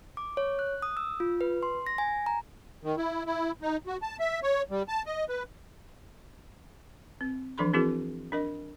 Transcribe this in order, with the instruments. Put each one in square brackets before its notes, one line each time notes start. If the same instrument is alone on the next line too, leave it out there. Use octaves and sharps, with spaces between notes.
[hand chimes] D6
C#5
F#6
D#6
E6
F4
B4
C6
A#6
G#5
A#5
[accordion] D#3
E4
E4
D#4
F#4
A5
E5
C#5
G3
A5
D#5
B4
[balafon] C4
E3 F3 D4 A4 B5 C6
C4 E4 F#4 G#4 A#4
D4 A#4 D#5